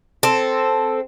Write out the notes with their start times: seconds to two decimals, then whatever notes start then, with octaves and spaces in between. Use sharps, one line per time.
0.23 C4 A4